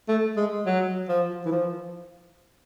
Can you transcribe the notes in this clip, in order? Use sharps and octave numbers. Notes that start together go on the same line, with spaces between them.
A3
G#3
F#3
F3
E3
F3